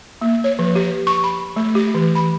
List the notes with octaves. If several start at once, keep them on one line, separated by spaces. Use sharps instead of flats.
A#3
C#5
F3
G4
C#6
B5
A3
G4
E3
B5